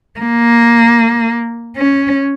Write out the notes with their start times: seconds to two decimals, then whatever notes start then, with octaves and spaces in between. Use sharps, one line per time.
0.20 A#3
1.77 C#4